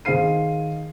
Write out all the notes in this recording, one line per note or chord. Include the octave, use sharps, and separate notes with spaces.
D#3 G#4 C5 F5 C7 D#7